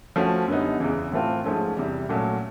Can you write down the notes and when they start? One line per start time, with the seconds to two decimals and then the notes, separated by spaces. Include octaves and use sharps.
0.16 F3 A3 C#4 F#4
0.48 F#2 D3 G3 B3 D#4
0.80 E2 C#3 E3
1.12 A2 E3 A3 C4 F4
1.44 G#2 F3 A3 C#4
1.76 E2 C3 E3 G3
2.09 A#2 F#3 A3 C#4